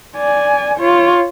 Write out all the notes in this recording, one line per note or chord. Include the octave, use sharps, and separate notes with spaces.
D5 G#5
F4 C#5